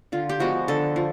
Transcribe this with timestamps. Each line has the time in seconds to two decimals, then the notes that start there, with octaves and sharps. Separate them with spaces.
0.12 D3 F4
0.29 G4
0.40 F3 G#3 B3 F#4
0.68 D3 A4
0.96 F3